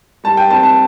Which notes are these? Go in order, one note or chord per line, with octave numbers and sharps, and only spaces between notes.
G3 A5
G5
C4 A5
A5